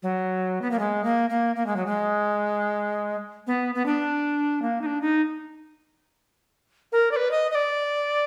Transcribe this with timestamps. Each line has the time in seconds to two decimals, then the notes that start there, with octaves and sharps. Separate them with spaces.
0.03 F#3
0.62 B3
0.71 A#3
0.79 G#3
1.04 A#3
1.30 A#3
1.56 A#3
1.67 G#3
1.76 F#3
1.86 G#3
3.47 B3
3.75 B3
3.86 D4
4.62 A#3
4.81 D#4
4.86 D4
5.02 D#4
6.92 A#4
7.12 D5
7.16 B4
7.31 D#5
7.50 D#5
7.55 D5